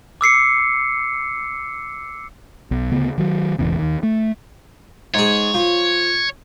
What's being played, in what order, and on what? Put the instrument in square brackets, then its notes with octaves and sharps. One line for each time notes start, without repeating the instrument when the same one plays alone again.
[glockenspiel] D6 E6 C7 C#7
[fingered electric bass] B1
D2 C#3 B3
D#3 F#3
E1 A1 E2 C#3
D#2 D#3
A3
[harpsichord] G#2 G#4 [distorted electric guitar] C#5
[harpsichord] F3